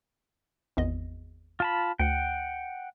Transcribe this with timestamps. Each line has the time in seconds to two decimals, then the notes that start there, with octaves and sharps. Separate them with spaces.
0.77 G#1 E2 D#5
1.60 F4 A5 B5
1.99 D2 F#5 G5